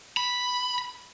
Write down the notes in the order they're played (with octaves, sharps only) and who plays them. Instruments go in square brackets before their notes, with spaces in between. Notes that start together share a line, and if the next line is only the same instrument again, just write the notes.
[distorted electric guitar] B5